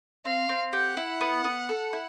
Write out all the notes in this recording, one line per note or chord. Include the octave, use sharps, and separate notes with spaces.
C4 F5
C4
G4 F#5
E4
B3
B3
A4
E4